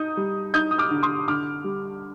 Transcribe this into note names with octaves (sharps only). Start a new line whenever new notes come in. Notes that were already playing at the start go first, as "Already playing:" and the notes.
Already playing: D#4 D#6 G6
G3
D#4 D#6 G6
D#6
D6 F6
D3
C6 D#6
D3 D6 F6
G3